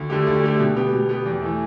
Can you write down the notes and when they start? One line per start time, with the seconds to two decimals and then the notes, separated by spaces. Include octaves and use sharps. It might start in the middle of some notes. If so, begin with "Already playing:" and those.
Already playing: D2
0.10 D3 A3 G4
0.27 D2
0.43 D3 A3 G4
0.60 B2
0.76 B3 G4
0.93 B2
1.09 B3 G4
1.26 E2
1.42 E3 A3